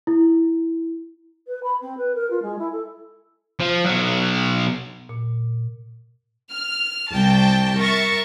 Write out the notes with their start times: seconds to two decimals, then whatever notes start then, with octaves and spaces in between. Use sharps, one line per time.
0.07 E4
1.47 B4
1.63 B5
1.82 C4
1.97 B4
2.15 A#4
2.30 F4
2.42 G#3
2.59 E4
2.73 A4
3.60 F3
3.85 B2 F#3
5.09 A#2
6.50 F6
7.11 C2 G5 A5
7.79 A#4 E5 C#6 A6